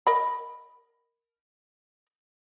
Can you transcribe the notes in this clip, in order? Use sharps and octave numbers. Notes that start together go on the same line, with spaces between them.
A#4 D#5 B5